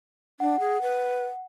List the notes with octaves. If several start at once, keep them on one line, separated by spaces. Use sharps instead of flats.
D4 F#5
G#4
B4